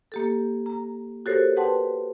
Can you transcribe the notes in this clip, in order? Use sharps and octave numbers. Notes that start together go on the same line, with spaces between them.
A#3 G4 A4
A#5
F#4 G4 A4 A#4 C5 C#5
B4 F#5 G5 A5 C6